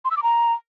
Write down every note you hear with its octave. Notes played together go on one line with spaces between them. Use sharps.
C6
E6
D6
A#5